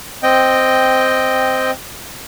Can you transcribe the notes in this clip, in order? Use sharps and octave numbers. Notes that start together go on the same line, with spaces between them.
C4 D#5 G5